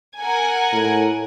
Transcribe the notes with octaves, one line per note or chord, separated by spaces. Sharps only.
A#4 F#5 G#5
A2